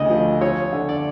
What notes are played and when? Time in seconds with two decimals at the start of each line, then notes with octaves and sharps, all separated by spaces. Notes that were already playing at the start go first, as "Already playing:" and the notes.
Already playing: D2 C#3 D5 D#5
0.10 F3
0.41 F3 C#5
0.73 D3
0.89 D5